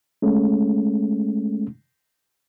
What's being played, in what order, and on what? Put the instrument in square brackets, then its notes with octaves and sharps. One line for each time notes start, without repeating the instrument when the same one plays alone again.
[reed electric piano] G#3 A3 C#4